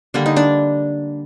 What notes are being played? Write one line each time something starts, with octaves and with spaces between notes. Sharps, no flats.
D3 G3 A#3 D4
D#4
D4